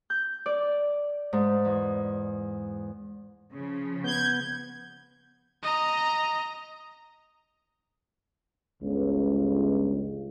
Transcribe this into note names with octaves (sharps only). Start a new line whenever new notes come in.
G6
D5
G#2
E2
C#3 F3
B3 G6 G#6
D#5 A#5
G1 C#2